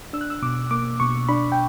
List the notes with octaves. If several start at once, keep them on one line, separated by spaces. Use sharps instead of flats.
D4 E6
F#6
E6
B2 D6
A#3 D6
B2 C#6
D4 B5
G5